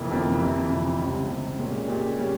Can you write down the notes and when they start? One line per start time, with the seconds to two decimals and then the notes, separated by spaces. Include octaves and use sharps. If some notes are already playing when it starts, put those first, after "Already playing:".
Already playing: F1 F2 E3 A#3
0.10 F1 F2 E3 A#3
0.40 F2 C3 E3
0.69 F2 C3 E3
0.99 C#2 C3 G3 C4
1.29 C#2 C3 G3 C4
1.59 A#2 G#3 C#4 G4
1.88 A#2 G#3 C#4 G4
2.19 G3 C#4